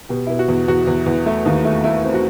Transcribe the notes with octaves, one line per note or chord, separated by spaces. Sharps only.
B2 G4
B2 E4
F#4
E2
E2 F#4
E2
E2
A3
D#2
A3
A3 E4
C4
F#4